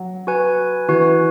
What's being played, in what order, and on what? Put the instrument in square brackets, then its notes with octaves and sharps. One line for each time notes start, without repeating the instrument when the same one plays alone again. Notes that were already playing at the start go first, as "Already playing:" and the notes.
Already playing: [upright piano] F#3
[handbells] F#4 B4 G#5
[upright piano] E3 [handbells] F#4 B4 G#5